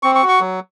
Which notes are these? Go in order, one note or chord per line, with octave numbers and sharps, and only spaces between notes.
C4 C#6
C#6
F#4
C#6
F#3